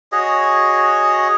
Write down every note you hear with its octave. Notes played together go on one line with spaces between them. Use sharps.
F#4 G#4 C#5 D#5